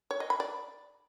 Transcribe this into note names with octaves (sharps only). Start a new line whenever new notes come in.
C#5
D#5
B5
D5